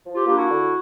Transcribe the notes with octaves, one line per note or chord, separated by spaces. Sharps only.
F3
F4 G4
A#3 D4 F4 G4
E4 F#4
D3